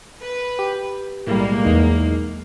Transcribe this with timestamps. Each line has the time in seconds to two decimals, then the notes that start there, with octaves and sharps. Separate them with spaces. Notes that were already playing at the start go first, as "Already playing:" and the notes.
0.22 B4
0.59 G4
1.27 B1 A2 G3 G#3 A#3
1.65 E2 D#4